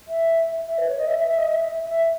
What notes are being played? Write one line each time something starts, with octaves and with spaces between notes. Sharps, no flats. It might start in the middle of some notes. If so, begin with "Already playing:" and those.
E5
E5
B4
C#5
D#5
E5
E5
E5
D#5
E5
E5